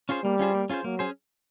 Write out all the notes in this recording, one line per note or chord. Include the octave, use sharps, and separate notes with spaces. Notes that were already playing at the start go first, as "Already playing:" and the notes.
C#4 F4 G#4 C5
G3 A#3
C#4 F4 G#4 C5
A#3
C#4 F4 G#4 C5
F#3 A#3
C#4 G#4 C5